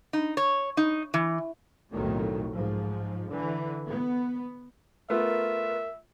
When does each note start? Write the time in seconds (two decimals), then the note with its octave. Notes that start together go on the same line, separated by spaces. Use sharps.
0.13 D#4
0.37 C#5
0.77 D#4
1.14 E3
1.93 B1 F2 A2 D#3 F#3 A3
2.54 G#2 F3
3.33 D3 E3
3.88 B3
5.10 A3 B3 F4 A#4 E5